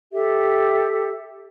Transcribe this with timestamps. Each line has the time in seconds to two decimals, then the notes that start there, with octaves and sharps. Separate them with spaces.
0.12 G4 A4 E5